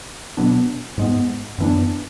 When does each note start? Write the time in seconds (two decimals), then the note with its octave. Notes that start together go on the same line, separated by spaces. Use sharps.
0.37 B2 F#3 B3 D4
0.97 G#2 G#3 B3
1.58 F#2 E3 B3 D4